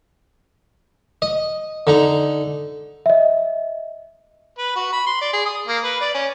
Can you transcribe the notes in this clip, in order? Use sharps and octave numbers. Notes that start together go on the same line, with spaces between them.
D#5
D3 D#4 A#5
D#5 E5
B4
F#4
B5
C6
D5
G#4
D#6
A#3
B4
D5
C#4